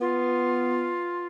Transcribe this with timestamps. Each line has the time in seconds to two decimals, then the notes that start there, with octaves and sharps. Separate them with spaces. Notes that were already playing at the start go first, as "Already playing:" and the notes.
0.01 B3 F4